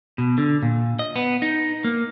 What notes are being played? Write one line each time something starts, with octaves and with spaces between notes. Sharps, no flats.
B2
D3
A#2
D#5
B3
D#4
A#3